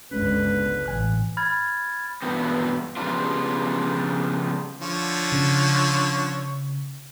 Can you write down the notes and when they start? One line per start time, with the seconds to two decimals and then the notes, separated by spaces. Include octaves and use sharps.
0.11 G1 C#2 D3 G#3 C#4 B4
0.86 A1 G#5 F#6
1.37 B5 F6 G#6 A6
2.22 G2 B2 E3 B3 C4
2.96 C#3 F3 G3 B3 D4 F4
4.81 D3 F3 C#5
5.32 C#3